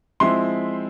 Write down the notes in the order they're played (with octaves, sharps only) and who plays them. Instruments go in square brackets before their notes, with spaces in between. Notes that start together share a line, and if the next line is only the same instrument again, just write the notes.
[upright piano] F3 G#3 C4 E4 [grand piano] C6